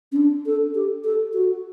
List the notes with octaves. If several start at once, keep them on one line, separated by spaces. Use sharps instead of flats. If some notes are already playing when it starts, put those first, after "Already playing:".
C#4
D4
A4
G4
A4
F#4